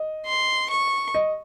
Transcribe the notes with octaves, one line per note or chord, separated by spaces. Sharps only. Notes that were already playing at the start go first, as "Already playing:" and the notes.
Already playing: D#5
C6
C#6
D#5